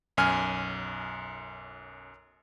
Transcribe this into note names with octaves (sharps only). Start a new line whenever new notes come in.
B1 F#2 G#5 F6